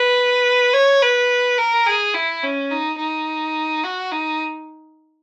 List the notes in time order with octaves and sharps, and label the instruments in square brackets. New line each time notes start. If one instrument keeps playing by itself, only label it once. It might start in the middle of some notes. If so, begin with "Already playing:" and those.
Already playing: [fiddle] B4
C#5
B4
A#4
G#4
E4
C#4
D#4
D#4
F#4
D#4